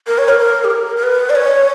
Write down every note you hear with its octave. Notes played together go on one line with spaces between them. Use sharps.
A#4
C#5
A#4
A#4
G4
A#4
A#4
B4
D5
C#5